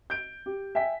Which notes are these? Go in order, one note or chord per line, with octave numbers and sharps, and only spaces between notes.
G6 D7
G4
E5 G5 G#5 B6